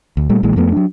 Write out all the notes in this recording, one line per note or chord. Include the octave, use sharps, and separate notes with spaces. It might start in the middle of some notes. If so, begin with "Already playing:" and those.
D2
A#2 G3 A3
A#1 A#2 E3 G#3
F2 F3 A3 B3
F#3 D4